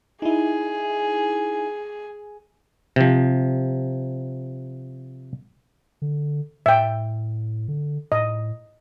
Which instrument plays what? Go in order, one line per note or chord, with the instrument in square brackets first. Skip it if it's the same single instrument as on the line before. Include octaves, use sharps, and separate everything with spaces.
[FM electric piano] D#4 E4 [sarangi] G#4
[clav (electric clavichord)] C3 F3
[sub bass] D3
[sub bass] A2 [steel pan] E5 G5
[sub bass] D3
[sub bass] A2 [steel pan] D#5